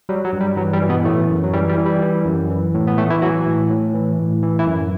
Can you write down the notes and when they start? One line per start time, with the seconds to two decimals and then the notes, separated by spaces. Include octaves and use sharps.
0.09 F#3 G3
0.25 F#3
0.33 G2
0.41 G3
0.57 E3 F#3
0.73 G3
0.81 E3
0.89 B2 B3
1.05 A2 E3 A3
1.29 F#2
1.44 F#3
1.53 E3 G3
1.69 G3
1.78 E3
1.86 G3
2.02 E3
2.26 F#2
2.50 E3
2.74 A2
2.87 B3
2.98 A2 E3 A3
3.10 E3 E4
3.22 E3 F#3 F#4
3.46 A2
3.70 A2
3.94 E3
4.19 A2
4.43 E3
4.59 E3 E4
4.67 F#2